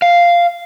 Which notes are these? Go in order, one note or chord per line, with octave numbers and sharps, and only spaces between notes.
F5